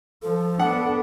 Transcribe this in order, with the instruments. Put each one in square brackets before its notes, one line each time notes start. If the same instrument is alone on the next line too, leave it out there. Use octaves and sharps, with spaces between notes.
[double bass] F3 [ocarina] A4
[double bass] B3 D4 [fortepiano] F#5